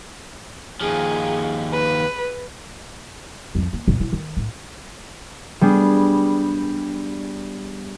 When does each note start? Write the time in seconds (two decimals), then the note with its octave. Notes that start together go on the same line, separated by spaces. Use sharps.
0.81 D#2 F3 G#4
1.72 B4
3.55 F2 F3
3.73 A#3
3.88 F2 A#2
4.00 B2 E4
4.13 D#3
4.37 A2
5.61 G3 B3 D4 G#4